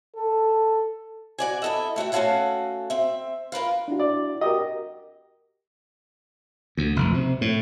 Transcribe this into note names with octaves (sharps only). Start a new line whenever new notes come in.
A4
F#4 D5 G#5
E4 A4 D#5
A3 F#4 E5 G5
A3 C#4 F#4 A4 F5 F#5
C4 E5
F4 A#4 B4 F5
D4 E4 F#4
D5
F#4 G4 A#4 D#5
D2
F1
C3
A2